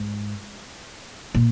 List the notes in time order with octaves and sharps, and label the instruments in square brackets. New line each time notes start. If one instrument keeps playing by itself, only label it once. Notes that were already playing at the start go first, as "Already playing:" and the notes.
Already playing: [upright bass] G#2
A#2